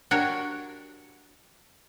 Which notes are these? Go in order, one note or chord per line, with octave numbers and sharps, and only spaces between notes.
D4 F#4 G4 A#4 C#5